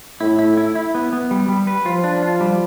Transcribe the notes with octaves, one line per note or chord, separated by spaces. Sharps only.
A2 E4
E4
E4
E4
B3
B3
G3
G3
B4
F3 F4
D4
F4
G3